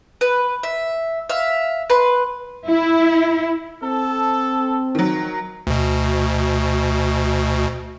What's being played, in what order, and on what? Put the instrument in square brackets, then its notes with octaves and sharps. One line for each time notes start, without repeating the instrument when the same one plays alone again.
[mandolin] B4
E5
E5 F5
B4 C6
[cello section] E4
[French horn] C4 [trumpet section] A4
[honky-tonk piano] D#3 F#3
[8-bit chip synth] D2 B2